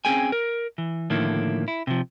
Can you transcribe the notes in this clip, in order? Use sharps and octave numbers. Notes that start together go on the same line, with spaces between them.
C4 C#4 G#4 G5 G#5
A#4
E3
A2 D3 D#3 F3 A#3 E4
E4
C3 F3